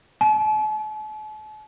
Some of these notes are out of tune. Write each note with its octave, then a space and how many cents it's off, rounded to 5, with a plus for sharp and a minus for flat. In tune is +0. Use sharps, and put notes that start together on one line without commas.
A5 -45